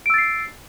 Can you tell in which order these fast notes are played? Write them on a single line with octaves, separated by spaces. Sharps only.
D7 E6 A6 C7